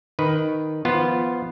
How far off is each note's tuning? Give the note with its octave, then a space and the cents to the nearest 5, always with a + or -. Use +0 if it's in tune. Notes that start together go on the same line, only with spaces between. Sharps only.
D#3 +0 B4 +0
F3 -20 B3 -5 F4 +0